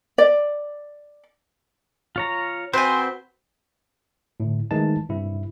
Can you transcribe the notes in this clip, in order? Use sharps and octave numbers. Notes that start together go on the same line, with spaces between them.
D5
F4 C#5 A#5
C4 F#4 B4 C5 G#5
A2 D3
D#3 E3 G#3 A3 D#4 A5
G2 C3 E4